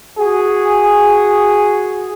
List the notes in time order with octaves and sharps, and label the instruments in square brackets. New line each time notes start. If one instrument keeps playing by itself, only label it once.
[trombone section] F#4 G#4